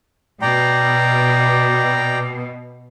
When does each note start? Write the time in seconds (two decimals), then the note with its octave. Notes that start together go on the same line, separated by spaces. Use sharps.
0.42 B2 D5 G5 A#5